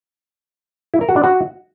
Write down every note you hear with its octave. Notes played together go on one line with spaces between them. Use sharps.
E4
A#4
F#4
D4
F#4